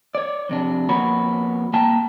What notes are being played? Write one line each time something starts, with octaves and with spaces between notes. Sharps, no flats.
C#5 D5
F2 C3 D4
F2 A#3 B3 F#4 C#5 B5
C2 A#3 G5 A5 A#5